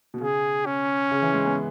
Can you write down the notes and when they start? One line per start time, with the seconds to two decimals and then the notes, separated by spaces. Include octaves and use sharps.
0.14 B2
0.21 C#3 G#4
0.66 C#4
1.11 C#3
1.22 E3
1.34 G#3
1.45 B3